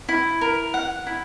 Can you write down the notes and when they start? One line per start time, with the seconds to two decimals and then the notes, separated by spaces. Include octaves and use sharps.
0.09 E4
0.41 A#4
0.74 F#5
1.07 E4